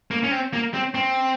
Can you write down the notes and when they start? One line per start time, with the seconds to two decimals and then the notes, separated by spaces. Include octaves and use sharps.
0.11 A#3
0.24 C#4
0.31 C4
0.53 A#3
0.74 C4
0.95 C4